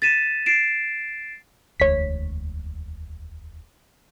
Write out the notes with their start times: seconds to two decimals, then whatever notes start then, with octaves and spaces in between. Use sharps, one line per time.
0.02 A6 B6 D#7 E7
0.46 A6 C7 D7 E7
1.80 E1 D2 C#5 B6